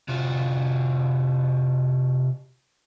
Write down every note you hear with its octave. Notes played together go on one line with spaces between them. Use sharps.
C3 F4 F#4